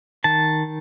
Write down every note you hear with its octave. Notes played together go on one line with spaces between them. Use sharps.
D#3 A5